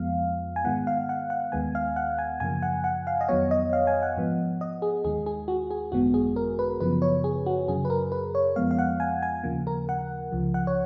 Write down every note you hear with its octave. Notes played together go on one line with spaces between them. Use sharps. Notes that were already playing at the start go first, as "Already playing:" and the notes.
Already playing: F2 F3 G#3 B3 F5
G#5
G#2 D#3 G#3 B3 F#5
F5
F#5
F#5
D#2 D#3 G#3 B3 G#5
F5
F#5
G#5
F#2 C#3 F3 A#3 G#5
F#5
F#5
F5
D#5
F2 D#3 F#3 B3 C#5
D#5
F5
G#5
F#5
G#2 F3 B3
D#5
G#4
D#2 D#3 G#3 G#4
G#4
F#4
G#4
G#1 F#2 D#3 G#3 B3 F#4
G#4
A#4
B4
F#2 C#3 F3 B3 B4
C#5
G#4
F#4
F#2 C#3 F#3 G#4
B4
A#4
B4
C#5
F2 F3 G#3 B3 F5
F5
F#5
G#5
G#5
D#2 C#3 F3 A#3
A#4
F#5
C#2 C#3 F3
F#5
C#5